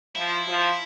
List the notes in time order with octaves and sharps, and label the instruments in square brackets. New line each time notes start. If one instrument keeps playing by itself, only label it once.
[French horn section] F3 [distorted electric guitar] E4
[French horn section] F3